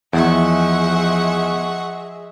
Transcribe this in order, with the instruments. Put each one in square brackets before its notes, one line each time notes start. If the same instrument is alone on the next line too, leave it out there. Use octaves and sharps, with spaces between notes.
[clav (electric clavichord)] E2 [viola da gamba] F3 [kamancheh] G#3 E5 [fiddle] F#5 C#6